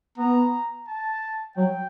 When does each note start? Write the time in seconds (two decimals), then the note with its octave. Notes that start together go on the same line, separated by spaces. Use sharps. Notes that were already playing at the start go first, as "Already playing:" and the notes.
0.18 B3 A#5
0.88 A5
1.56 F#3 G5